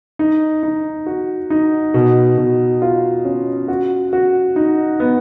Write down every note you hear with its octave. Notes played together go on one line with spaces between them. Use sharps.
D#4
D#4
F#4
D#4
B2
B2
F4
C#4
F#4
F#4
D#4
B3